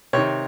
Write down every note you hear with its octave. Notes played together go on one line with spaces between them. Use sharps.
C3 D#3 C#5